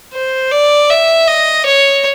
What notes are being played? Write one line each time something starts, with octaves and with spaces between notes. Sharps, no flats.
C5
D5
E5
D#5
C#5